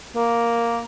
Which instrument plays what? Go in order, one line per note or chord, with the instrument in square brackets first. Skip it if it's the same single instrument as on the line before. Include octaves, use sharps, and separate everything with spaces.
[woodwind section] A#3